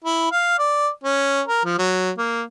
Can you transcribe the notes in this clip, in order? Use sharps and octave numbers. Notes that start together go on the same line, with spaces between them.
E4
F5
D5
C#4
A#4
F3
F#3
A#3